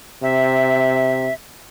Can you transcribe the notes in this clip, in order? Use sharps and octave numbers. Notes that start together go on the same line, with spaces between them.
C3 E5